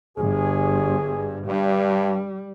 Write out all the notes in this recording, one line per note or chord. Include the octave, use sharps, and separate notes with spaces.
G1 G2 G#4
G2 G3